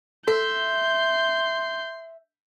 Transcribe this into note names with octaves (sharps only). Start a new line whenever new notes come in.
A4 E5 C6 G6